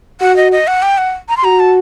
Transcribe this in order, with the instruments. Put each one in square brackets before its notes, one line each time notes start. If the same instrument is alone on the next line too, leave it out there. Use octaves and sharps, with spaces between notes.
[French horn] F#4 [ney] F#5
[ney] D#5
D#5
F#5
G5
F#5
A#5
C6
[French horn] F#4 [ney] A#5
[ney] A5